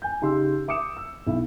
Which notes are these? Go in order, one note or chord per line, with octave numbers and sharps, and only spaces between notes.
G#5 G6
C#3 D#4 G4 C6 E6
E5 D6 D#6 C#7 E7
E6
B1 E4